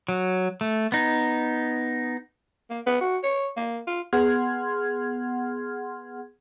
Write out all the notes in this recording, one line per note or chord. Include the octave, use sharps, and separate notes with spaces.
F#3
A3
B3 D#4
A#3
B3
F#4
C#5
A#3
F4
B3 G#4 F#5 C6 F6 G#6